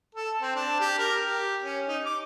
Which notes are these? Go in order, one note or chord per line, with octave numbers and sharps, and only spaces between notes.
A4
C4
D4
G4
A#4
G4
C#4
D#4
D6